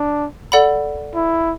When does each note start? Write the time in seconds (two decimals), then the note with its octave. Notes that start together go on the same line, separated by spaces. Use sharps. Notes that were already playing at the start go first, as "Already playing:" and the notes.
Already playing: D4
0.52 A4 D5 F#5 B5
1.15 E4